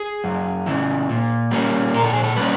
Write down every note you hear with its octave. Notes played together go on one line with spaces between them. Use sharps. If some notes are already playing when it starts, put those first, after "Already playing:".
Already playing: G#4
F#2
C#3 E3
A#2
G3 A#3 C#4
A#2 A#4
A4
G#4
A4
G3 A#3 C#4 B4